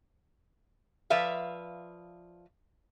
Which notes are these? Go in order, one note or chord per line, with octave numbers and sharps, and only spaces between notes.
F3 B4 D5 E5 F5